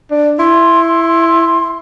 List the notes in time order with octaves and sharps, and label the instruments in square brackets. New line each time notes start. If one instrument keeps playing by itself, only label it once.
[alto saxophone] D4
[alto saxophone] E4 [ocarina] C6